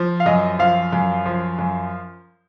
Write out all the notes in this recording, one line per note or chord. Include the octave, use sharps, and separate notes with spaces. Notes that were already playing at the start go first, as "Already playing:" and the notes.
Already playing: F3
F5
F#2 D#5
F3 F5
F#2
F3
F#2